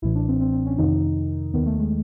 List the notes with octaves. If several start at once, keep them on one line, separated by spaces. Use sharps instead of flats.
A1 A2 E3 E4
D4
C4
C4
C4
C#4
F2 C3 D#3 D#4
D#2 D#3 B3
A3
G#3